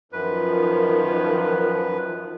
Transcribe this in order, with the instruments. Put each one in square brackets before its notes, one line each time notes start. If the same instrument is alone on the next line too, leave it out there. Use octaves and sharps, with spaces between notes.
[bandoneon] F#2 B4 [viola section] D#3 F3